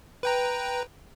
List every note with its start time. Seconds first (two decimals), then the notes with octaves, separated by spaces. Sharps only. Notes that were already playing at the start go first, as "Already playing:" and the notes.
0.23 B4 G5 A#5